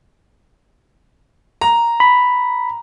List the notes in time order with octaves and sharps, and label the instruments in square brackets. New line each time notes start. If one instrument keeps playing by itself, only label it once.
[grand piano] A#5
[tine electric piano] B5